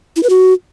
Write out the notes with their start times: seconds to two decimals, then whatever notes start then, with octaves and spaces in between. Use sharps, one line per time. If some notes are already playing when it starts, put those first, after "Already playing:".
0.16 E4
0.23 B4
0.30 F#4